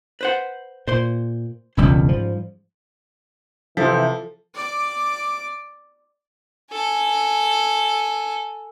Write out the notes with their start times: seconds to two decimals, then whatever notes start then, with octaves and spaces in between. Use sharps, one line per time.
0.21 B4 C5 F#5
0.87 A#2 C5 C6
1.77 E1 C#2 G3 C#4
2.06 G#2 F3
3.77 C3 E3 F3 A4 B6
4.54 D5 D6
6.73 A4 G#5